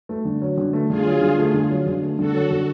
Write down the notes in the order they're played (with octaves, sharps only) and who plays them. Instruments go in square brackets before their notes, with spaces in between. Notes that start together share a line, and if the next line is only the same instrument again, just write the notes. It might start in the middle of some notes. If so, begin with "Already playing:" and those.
[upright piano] A3
D3
F#3
D3
A3
[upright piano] D3 [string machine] F4 G#4
[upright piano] F#3
D3
A3
D3
F#3
D3
A3
[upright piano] D3 [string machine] F#4 A4
[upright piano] F#3
D3